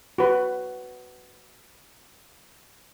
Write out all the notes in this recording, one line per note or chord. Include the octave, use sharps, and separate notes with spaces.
F#4 B4